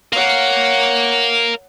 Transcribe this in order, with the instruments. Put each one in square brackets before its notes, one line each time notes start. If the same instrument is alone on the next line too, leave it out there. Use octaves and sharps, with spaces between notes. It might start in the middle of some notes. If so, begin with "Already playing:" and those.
[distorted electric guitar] A#4 F5 [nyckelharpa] C#5 F#5